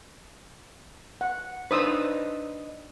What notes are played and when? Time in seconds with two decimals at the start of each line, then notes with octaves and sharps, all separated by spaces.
1.21 F#5
1.71 D4 D#4 B4 C5 D#6 E6